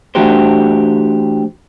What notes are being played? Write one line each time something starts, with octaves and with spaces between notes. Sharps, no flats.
E3 A3 D4 F#4 G4 C5